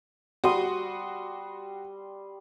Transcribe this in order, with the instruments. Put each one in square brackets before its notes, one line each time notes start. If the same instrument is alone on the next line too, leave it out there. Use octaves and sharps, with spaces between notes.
[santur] G3 C6 D#6 [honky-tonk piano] F#4